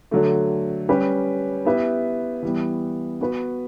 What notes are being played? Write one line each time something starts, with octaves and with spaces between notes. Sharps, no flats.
D3 F#3 A3
G3 C#4 G4 B4
B3 E4 G4 B4 E5
E3 G3 B3
B3 F#4 B4